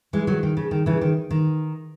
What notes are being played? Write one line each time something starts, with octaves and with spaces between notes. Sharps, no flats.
E3 G#3
D#3 F#3
D#3
C#3
D#3
C#3 E3
D#3
D#3